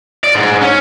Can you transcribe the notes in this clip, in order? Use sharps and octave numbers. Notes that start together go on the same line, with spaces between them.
D5
G#2
C#4